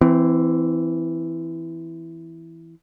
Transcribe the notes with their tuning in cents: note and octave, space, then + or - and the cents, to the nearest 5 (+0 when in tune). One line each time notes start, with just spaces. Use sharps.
E3 +0 C4 -25